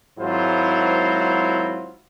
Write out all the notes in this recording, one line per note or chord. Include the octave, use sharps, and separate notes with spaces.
G#1 G#2 F#3 E4 F4 C5